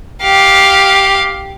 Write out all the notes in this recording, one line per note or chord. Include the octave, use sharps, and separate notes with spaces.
G4 F5